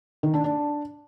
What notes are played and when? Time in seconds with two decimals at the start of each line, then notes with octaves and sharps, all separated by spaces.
0.23 D#3
0.34 D4
0.44 D4